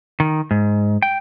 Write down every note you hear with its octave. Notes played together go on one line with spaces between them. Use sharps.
D#3
G#2
G5